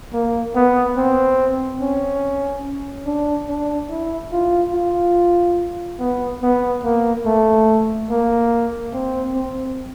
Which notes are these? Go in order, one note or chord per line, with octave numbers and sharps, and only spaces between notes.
A#3
B3
C4
C#4
D4
D4
E4
F4
F4
B3
B3
A#3
A3
A#3
C4
C4